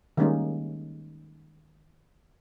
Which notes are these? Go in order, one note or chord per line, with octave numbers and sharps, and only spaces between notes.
D#3 G3 G#3 A#3 C#4 D#4